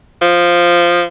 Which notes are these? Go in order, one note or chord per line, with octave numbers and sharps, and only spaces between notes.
F3